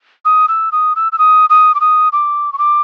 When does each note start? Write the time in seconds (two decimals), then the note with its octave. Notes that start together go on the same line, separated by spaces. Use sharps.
0.25 D#6
0.48 E6
0.72 D#6
0.96 E6
1.12 E6
1.18 D#6
1.50 D#6
1.75 D6
1.80 D#6
2.13 D6
2.53 C#6
2.58 D6